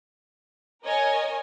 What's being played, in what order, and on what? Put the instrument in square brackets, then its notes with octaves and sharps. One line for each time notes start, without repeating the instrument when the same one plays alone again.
[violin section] A#4 C#5 D#5 G#5